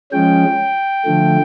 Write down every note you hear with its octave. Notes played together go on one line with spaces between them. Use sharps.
F3 G#3 C#4 G5
D3 F3 A3